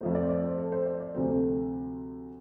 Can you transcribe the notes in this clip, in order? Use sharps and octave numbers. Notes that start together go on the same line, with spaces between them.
F2 F3 A3 C5
D5
C5
D5
C5
A4
C5
D5
D5
D2 C3 F3 A3 C5
A4